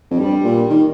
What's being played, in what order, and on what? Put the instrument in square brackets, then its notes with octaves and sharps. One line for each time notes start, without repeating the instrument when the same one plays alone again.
[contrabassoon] F2
[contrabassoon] G2 [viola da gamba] G3
[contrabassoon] A#2
D#3